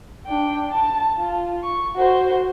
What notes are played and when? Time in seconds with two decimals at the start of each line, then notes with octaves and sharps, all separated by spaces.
0.27 D4 G5
0.70 A5
1.18 F4
1.63 C#6
1.96 F#4 C5